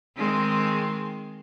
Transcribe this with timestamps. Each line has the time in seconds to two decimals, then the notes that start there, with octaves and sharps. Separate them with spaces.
0.17 D#3 G#3 C4